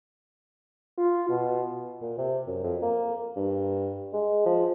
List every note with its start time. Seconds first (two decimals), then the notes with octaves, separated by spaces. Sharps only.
0.98 F4
1.29 B2
2.02 A#2
2.18 C3
2.47 F#2
2.63 F2
2.83 A#3
3.36 G2
4.13 G#3
4.46 F3